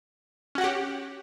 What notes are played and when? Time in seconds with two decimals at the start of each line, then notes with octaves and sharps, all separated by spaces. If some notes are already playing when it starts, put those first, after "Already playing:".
0.55 C#4
0.58 F#4
0.61 F#5
0.64 G4